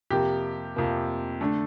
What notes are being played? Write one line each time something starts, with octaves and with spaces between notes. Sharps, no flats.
F2 C3 F3 A#3 G4
F2 C3 F3 A#3
D3 A3 D4